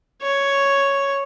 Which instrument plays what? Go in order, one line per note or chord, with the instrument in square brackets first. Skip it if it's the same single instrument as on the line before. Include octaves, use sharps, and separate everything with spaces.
[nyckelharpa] C#5